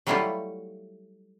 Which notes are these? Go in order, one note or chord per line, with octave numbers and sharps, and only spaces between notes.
F#3 G3 A3 E4 F4 G4